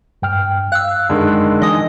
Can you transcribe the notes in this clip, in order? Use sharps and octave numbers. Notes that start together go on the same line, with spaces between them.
G2 G5 F6
F5 E6 F#6
F#2 D3 D#3 G#3
E3 D#4 D#5 G#5 D#6